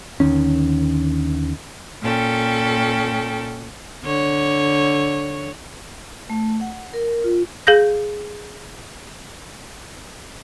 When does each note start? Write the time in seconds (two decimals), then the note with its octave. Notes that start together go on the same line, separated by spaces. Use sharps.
0.20 D#2 D3 D#3 C#4
2.03 A#2 C#4 A4 G5
4.03 D3 C#5
6.30 A3
6.61 F#5
6.94 A#4
7.24 F4
7.67 G#4 F5 G6 A#6